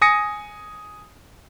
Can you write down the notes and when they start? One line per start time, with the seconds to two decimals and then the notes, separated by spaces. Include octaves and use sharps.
0.02 G#5 D#6 A#6 C#7